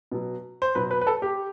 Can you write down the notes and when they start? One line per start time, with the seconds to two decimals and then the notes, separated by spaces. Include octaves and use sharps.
0.12 B2 F#3
0.62 C5
0.75 B2 F#3 B4
0.91 B4
1.01 B4
1.07 A4
1.22 G4